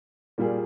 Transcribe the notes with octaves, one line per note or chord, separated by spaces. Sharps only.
A#2 G3 A#3 F4 G#4